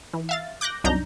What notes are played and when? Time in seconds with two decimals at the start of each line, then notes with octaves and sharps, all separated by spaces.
0.13 E3
0.29 E5 F5 A6
0.61 D6 F#6 G6 A#6
0.84 C2 F#2 D4 D#4 A#5 G6